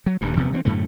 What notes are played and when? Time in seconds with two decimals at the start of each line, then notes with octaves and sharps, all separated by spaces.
0.06 F#3
0.21 D#1 D2 G2
0.36 D#1 C3 F3 B3
0.52 E3 A3 C4
0.65 F#2 A2 D3 A3